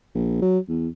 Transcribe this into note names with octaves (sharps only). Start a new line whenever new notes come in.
A#1
F#3
E2